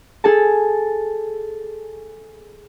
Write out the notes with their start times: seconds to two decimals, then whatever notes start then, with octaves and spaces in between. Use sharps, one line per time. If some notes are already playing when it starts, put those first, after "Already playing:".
0.24 G#4 A4 A5